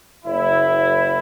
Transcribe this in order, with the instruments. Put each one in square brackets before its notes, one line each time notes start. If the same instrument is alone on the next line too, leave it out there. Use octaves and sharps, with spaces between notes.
[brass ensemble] F#1 E4